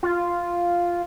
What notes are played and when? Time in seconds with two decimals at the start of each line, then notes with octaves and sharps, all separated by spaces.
0.03 F4